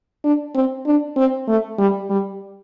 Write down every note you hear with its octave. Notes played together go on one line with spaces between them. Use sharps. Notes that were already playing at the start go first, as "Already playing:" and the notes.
D4
C4
D4
C4
A3
G3
G3